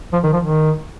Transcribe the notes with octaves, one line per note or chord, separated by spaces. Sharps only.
F3
D#3
F3
D#3